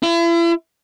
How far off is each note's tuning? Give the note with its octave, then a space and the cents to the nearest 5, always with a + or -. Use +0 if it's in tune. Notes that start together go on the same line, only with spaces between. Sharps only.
E4 +40